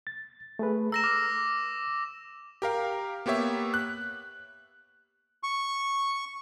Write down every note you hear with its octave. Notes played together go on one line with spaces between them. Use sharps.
A6
A3 G#4 B4
A#5 E6 A#6 E7
D6 F6
G4 A#4 F5
A#3 B3 G4 C#5 E5
F#6
C#6